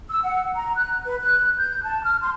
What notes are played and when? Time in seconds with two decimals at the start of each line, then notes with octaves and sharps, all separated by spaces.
0.09 E6
0.22 F#5
0.55 A#5
0.76 F#6
1.05 B4
1.21 F#6
1.58 G6
1.83 A5
2.04 F6
2.22 C6